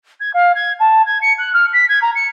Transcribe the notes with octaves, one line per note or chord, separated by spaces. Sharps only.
G#6
F5
G#6
A5
G#6
C#7
F#6
F6
B6
G#6
A#5
C#7